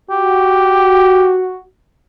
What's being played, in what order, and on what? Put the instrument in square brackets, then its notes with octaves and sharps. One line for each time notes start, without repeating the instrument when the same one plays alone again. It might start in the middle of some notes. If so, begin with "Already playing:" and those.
[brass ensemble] F#4 [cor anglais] G4